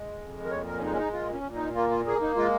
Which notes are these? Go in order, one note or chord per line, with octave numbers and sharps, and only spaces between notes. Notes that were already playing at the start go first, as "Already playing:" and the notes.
Already playing: G#3
F2
A#4
A#2 C#5
A#4
C#4
G#3 D#4
C#4
D#4
A#2 F4
C#4
A#2
D#4
A#3 F4
F4
A#3 G#4
D#4
G#3 F4